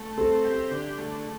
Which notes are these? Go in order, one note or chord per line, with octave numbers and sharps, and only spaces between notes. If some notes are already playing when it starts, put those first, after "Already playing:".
Already playing: A3
C4 A4
G4
D3
A3